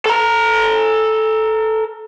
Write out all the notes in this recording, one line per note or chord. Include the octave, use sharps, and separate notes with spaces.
A4 A#5